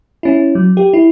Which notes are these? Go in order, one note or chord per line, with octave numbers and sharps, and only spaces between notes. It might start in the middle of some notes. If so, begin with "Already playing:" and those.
C#4 E4
F#3
G4
E4